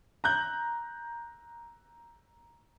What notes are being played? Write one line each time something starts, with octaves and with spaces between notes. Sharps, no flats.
A#5 F#6 G6